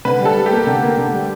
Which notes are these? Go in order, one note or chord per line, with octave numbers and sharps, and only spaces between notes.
D3 B4
G3 A4
G3
G4
A#3
D3
A#3
D3
G3